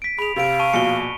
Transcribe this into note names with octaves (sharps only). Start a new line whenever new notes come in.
B6 D7
G#4 B5 F7
C3 F5 D7 F7
A5 C#6 D#7
A#1 B2 C#7 G7